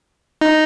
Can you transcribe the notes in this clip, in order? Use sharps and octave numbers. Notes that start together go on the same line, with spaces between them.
D#4